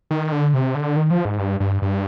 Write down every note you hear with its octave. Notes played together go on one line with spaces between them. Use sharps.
D#3
D3
C3
D3
D#3
F3
G#2
G2
G2
G2